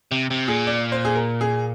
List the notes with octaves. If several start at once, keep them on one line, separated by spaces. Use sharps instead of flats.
C3
C3
A#2 G#4
D5
C5
G#4
A#4
G#4